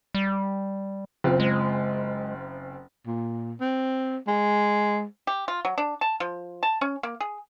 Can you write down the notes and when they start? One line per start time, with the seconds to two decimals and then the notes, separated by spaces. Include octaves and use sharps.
0.15 G3
1.24 F#1 C4 F4
1.40 G#3
3.07 A#2
3.61 C4
4.27 G#3
5.27 G4
5.48 F4
5.65 F#3
5.78 D4
6.01 A5
6.20 F3
6.63 A5
6.81 C#4
7.03 A#3
7.20 G#4